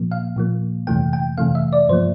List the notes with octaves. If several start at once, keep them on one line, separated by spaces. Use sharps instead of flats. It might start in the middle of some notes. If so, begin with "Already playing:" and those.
Already playing: A#2 F3 A#3
F5
A#2 F3 A#3
F2 C3 E3 A3 G5
G5
F2 C3 E3 A3 F5
E5
D5
G2 F3 A#3 C5